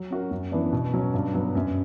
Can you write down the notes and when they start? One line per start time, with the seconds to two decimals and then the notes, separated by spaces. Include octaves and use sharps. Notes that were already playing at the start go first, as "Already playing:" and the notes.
Already playing: F#3
0.11 C#4 F#4 A#4
0.31 F#2
0.52 E3 B3 D4
0.73 B2
0.94 F#3 C#4
1.14 G2
1.34 F#3 B3
1.55 F#2